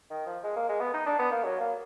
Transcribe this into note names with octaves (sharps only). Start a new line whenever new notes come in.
D#3
F3
G#3
A#3
G#3
B3
D#4
D4
B3
A#3
F#3
A#3